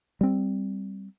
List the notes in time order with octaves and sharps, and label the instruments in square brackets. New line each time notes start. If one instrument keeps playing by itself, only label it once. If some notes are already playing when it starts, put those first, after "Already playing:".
[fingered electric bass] G3 C4